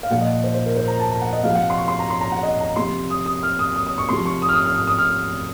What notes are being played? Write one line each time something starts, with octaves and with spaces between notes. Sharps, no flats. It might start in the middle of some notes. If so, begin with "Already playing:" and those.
F5
A#2 F3 F#5
D#5
C5
C5
A#4
C5
A#5
A5
A#5
F#5
D#5
C3 F3 F5
F#5
C6
C#6
C6
A#5
C6
A#5
F#5
D#5
A#5
C3 F3 C6
D#6
D#6
F6
D#6
D#6
D#6
C#6
C3 F3 C6
C#6
D#6
F6
D#6
F6
D#6
D#6
F6